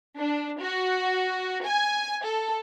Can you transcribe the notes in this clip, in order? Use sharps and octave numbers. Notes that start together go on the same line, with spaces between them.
D4
F#4
G#5
A4